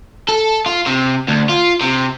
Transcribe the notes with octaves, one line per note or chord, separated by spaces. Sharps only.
A4
F4
C3
D2
F4
C3